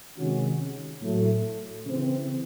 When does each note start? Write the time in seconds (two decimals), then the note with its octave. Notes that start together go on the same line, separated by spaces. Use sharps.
0.18 C3 D#3 G#3 C#4 F#4
1.02 A2 F#3 A3
1.86 C#3 E3 C4